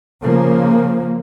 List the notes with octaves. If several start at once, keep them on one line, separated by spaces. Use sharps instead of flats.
C#3 F3 A#3